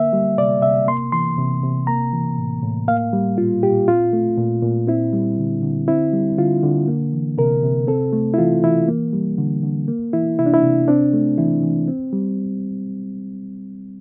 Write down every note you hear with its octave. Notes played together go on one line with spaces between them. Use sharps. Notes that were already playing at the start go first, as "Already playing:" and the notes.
Already playing: D3 A#3 E5
G3
C3 D5
C3 E5
A#3 C6
E3 C6
C3
C3
A#3 A#5
E3
A2
A2
A#3 F5
G3
A#2 F4
A#2 G4
C4 F4
A3
A#2
A#2
C4 E4
G3
D3
D3
C4 E4
G3
D3 F4
D3
A#3
E3
C3 A#4
C3
C4 A4
A3
E4
E3 F4
E3 E4
A#3
G3
D3
D3
A#3
E3 E4
C3 E4
D4
E4
C3
C4 D4
A3
E3 E4
E3
C4
G3